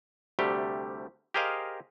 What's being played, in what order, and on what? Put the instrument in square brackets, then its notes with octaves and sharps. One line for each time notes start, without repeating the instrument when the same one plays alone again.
[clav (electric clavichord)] D2 C3 G3 A3 G4
G4 G#4 A#4 C5 D#5 F5